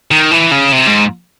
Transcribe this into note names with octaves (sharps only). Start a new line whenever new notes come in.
D#3
E3
C#3
C3
G#2